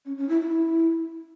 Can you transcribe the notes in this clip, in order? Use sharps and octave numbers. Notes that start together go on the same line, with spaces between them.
C#4
C#4
E4
E4